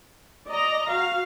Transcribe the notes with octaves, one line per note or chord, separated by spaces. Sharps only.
D5 D#5 A#5
F#4 F5